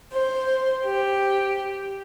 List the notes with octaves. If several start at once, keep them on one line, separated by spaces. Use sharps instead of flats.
C5
G4